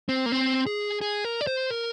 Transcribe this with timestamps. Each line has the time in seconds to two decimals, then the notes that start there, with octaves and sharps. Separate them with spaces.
0.09 C4
0.26 A#3
0.32 C4
0.66 G#4
1.01 G#4
1.25 A#4
1.41 D5
1.47 C5
1.70 A#4